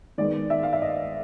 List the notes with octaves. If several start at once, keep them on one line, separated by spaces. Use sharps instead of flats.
D#3 G#3 B3 D5
E5
F5
E5
D#5